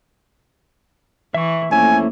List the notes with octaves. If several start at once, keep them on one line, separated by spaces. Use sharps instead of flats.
E3 E5 C#6
F2 A3 A#3 C#4 E4 G#5